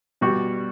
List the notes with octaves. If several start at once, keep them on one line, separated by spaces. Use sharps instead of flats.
B2 G3 F#4